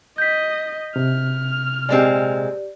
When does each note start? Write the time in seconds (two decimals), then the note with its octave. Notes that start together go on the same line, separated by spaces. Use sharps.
0.18 D#5 G6 B6
0.96 C3 F6
1.89 A#2 G#3 C4 G4 D5